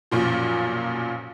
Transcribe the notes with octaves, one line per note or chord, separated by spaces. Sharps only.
B1 F#2 A#2 F3